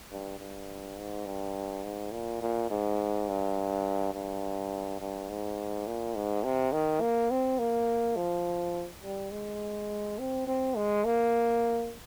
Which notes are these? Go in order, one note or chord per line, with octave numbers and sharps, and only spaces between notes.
G2
G2
G#2
G2
G#2
A#2
A#2
G#2
G2
G2
G2
G#2
A#2
G#2
C3
D#3
A#3
C4
A#3
F3
G3
G#3
C4
C4
G#3
A#3